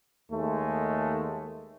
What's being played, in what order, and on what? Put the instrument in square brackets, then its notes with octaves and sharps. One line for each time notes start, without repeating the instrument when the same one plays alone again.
[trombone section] D#2 G#3 A3